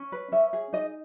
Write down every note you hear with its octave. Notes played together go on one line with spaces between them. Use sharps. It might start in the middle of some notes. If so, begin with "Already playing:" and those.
Already playing: C#4
B4
C#4 E5
G#4
D#4 D#5